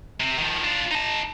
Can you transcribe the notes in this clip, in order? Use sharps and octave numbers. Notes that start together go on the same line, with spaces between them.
C3
D#3 F3
D4 F4
D#4 A5